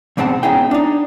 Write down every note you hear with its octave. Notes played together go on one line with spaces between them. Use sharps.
E2 G#2 B2 C4 F#5 A5
B3 C#4 D#4 E4 G#4 G5
D4 D#4